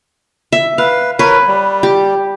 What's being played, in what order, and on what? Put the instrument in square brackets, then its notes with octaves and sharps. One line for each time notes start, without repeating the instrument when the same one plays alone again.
[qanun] E5
[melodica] B4 [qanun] F5
[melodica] A#4 C#5 [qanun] B4
[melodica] G3
[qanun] G4